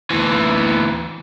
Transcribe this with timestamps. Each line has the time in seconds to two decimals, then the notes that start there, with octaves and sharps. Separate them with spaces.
0.11 D2 E3